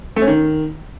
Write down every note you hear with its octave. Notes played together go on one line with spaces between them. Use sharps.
A3
C#4
D#3